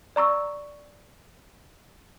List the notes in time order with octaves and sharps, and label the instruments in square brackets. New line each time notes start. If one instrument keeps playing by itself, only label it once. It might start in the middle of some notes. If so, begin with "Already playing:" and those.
[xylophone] D5 A#5 C#6 E6